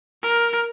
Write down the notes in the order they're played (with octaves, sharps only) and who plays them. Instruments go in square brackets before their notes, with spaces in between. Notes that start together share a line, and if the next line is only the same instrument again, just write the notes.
[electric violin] A#4